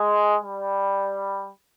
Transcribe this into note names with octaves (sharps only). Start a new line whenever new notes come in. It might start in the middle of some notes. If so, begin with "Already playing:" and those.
Already playing: G#3
G3